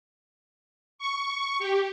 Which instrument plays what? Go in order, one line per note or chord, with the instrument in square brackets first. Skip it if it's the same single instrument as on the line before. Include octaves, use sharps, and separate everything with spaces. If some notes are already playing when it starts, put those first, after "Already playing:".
[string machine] C#6
G4